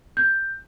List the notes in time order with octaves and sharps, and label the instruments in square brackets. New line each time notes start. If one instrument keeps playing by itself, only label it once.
[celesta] G6